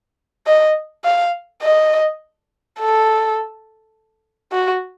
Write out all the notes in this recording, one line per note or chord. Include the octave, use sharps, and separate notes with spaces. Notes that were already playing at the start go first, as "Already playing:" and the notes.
D#5
F5
D#5
A4
F#4